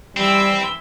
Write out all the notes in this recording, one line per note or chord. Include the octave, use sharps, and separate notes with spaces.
E3 G3 C4 B5 E6